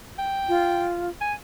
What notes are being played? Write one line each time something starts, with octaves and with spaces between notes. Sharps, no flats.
G5
F4
G#5